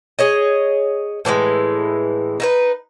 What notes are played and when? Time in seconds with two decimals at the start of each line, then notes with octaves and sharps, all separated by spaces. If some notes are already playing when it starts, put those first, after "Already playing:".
0.19 G#4 C#5 D#5
1.25 A2 E3 F3 G#3
2.40 D#4 E4 B4